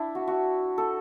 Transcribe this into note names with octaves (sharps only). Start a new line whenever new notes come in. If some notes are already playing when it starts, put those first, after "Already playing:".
Already playing: D4 E4
F#4
F#4
A4